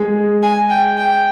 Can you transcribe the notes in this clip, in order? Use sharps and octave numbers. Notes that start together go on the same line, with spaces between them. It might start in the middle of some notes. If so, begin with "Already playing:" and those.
Already playing: G#3 G#4
G#5
G5
G5